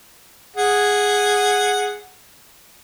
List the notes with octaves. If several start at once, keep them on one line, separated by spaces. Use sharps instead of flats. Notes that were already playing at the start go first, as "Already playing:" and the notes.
G#4 F#5